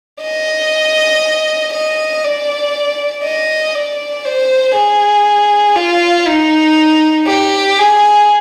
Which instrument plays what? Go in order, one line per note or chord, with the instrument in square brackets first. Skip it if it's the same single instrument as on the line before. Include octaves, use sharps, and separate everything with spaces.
[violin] D#5
D#5
D5
D#5
D5
C5
G#4
F4
D#4
G4
G#4